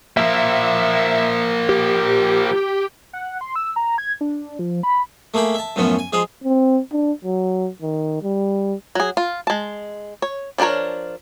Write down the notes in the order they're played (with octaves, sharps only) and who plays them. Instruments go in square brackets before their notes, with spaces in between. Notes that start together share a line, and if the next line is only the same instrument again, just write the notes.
[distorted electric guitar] F3 A#3 [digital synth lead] E5
[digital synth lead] G4
[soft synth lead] F#5
C6
E6
A#5
G#6
D4
F3
B5
[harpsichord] A3 A#3 G#4 G5 B5
E5 A5
F#2 A2 F3 B3 C#4
G#5
F3 G#3 G#4 F5
[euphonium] C4
D4
F#3
D#3
G3
[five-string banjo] F#3 G#4
F4
G#3 A5
C#5
F3 D4 F#4 A#4 C#5